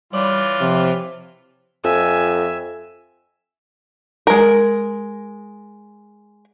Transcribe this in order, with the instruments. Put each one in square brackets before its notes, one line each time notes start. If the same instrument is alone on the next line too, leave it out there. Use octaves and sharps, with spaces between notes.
[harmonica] E3 F4 [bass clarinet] G3 [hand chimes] C#5 D6
[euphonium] C3 [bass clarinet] F3
[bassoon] F2 [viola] E5 G#5
[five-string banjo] G#3 A#4